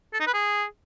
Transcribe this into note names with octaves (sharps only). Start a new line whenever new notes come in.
A4
D#4
B4
G#4